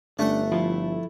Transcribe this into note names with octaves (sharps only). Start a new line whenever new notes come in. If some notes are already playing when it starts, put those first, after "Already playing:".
G1 A3 C#4 D4 F#5
F3 E4 F4 A4